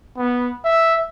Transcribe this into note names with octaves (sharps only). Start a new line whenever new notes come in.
B3
E5